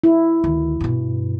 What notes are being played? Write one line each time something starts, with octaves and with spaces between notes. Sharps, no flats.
E4
D2 D#3
G2 B2